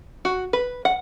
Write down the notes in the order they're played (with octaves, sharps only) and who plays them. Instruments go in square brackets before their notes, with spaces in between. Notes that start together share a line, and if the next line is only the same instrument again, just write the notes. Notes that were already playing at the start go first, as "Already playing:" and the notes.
[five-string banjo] F#4
B4
F#5